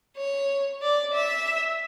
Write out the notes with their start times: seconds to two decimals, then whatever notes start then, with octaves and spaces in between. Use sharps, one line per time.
0.17 C#5
0.82 D5
1.14 E5